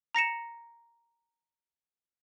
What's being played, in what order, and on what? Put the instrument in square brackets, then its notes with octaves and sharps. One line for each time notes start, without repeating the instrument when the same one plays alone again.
[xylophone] A#5 A#6 C#7 E7